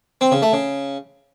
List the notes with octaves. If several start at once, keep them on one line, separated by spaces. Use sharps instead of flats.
C4
C#3
A3
C#3